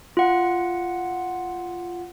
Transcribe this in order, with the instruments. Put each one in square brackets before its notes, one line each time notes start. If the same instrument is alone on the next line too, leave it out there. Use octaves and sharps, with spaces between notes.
[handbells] F4 F#5